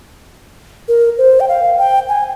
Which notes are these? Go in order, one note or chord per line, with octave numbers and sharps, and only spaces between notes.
A#4
C5
G5
F5
G5
G#5